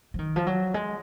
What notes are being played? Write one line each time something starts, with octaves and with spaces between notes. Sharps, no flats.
F3
D#3
F3
F#3
G#3